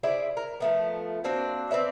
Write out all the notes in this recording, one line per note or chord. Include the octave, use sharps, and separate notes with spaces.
E4 G#4 C5 D5
A#4
F3 A3 B3
A#3 C4 D4 F#4
C4 B4 D5 E5